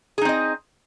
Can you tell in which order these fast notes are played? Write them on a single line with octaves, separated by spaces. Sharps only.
G#4 D#4 C4 D#5